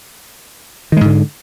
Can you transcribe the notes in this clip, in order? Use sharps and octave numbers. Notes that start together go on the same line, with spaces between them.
G#2 D3 D#3 G#3